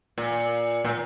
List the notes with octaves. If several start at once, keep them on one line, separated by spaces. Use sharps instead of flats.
A#2
A#2